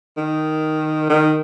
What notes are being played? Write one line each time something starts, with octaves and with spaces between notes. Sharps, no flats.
D#3
D#3